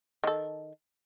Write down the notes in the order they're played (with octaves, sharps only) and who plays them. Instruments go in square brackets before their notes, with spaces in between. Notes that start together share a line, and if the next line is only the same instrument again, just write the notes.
[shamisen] D#3 A4